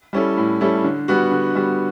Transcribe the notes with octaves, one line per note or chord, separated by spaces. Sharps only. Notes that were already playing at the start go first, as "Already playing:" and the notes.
G3 C#4 E4 A4
A2
G3 C#4 E4 A4
D3
G3 B3 F#4
D3
G3 B3 F#4